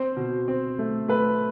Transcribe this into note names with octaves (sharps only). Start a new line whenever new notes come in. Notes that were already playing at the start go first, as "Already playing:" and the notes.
Already playing: C4 C5
B2
C4
A3
A3 B4